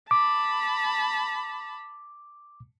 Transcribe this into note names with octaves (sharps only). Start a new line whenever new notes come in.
A5 B5 D6